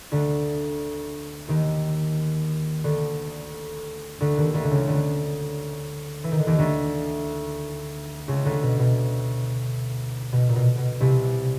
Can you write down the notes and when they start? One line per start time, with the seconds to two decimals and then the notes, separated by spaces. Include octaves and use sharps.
0.12 D2 D3
1.48 D#2 D#3
2.84 D2 D3
4.20 D2 D3
4.37 D#2 D#3
4.54 D2 D3
4.64 D3
4.71 C#2 C#3
4.88 D2 D3
6.24 E3
6.32 D#3
6.39 D3
6.47 D#2 D#3
6.58 D2 D3
8.28 C#2 C#3
8.45 D2 D3
8.63 B2
8.79 B2
10.33 B2
10.49 A#2
10.56 B2
10.78 B2
11.00 C2 C3